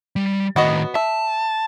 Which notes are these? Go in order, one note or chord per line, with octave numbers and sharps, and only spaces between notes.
G3
A2 D#3 B3 F#4 D#5
E5 A5